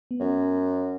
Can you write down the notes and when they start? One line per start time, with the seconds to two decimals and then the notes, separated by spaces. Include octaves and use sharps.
0.11 B3
0.20 F#2 C#4